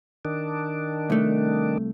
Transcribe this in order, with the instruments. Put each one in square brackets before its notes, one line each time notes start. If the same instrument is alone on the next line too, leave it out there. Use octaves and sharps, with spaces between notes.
[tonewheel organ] D#3 D4
[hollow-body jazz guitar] C2 A3